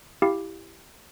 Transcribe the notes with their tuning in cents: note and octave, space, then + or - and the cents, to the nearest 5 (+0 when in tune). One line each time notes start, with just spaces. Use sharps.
E4 +0 G4 +0 F5 +0